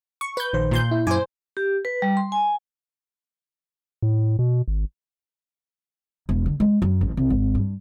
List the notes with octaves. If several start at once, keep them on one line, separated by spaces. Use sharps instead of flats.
C#6
B4 G6
A#1 D#3 C5
A#2 C6 G6
E4
F#2 E4 C5 G#5 D6
G4
B4
G3
C6
G#5
A2
B2
G#1
E1
D3
G#3
F#2
A1
C2
G#1
G2